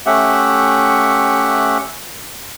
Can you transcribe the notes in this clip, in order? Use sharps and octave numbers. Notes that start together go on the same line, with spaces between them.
A3 C#4 G4 E5 F#5